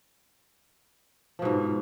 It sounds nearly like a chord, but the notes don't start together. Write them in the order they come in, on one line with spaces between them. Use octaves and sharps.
F3 B2 G#2